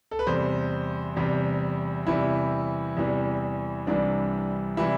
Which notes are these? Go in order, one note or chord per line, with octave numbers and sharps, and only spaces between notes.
A4
B4
E2 C3 G3 C5
E2 C3 G3
E2 C3 E3 G3 E4
E2 C3 E3 G3
C2 C3 E3 G3 D4
C3 E3 G3 E4